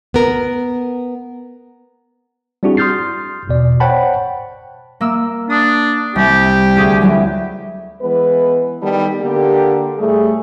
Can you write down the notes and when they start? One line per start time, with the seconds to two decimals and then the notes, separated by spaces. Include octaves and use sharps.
0.14 B3 A#4
2.63 G3 C4 D4 E4 F#4 G#4
2.77 C6 D#6 F6 G6 A6 C7
3.47 G1 E2 B2 D5
3.80 C5 C#5 F#5 G5 A5 B5
5.01 A#3 E6
5.50 D4 D#6
6.16 C2 G4
6.77 D2 G#4
7.02 F#3 G3 E4
8.01 E3 G#3 B3 B4
8.81 D#3 G3 B3 A4
9.20 D3 A#3 G4
9.98 A2 G3 A3 G#4